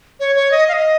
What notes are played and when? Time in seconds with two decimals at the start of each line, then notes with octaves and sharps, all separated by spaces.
0.20 C#5
0.36 C#5
0.51 D#5
0.68 F5
0.73 D#5